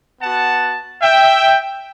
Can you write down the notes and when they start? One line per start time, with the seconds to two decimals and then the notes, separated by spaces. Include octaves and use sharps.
0.22 B3 F#4 F#5 A5
1.01 E5 G5